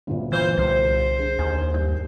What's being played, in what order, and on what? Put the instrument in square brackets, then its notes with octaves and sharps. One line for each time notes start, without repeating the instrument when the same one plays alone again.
[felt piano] G1 D2 A#2
[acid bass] E3 [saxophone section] F4 C5
[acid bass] C2 [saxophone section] C5
[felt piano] D4 G#4
[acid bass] D#2 [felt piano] G#5
[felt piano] G2 G6